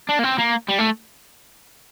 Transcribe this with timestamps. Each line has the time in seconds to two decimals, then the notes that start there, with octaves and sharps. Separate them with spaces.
0.09 D4
0.19 A#3
0.23 C4
0.38 A#3
0.68 G3
0.78 A3